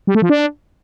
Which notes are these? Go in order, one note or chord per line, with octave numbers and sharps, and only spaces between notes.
G3
A3
F3
D4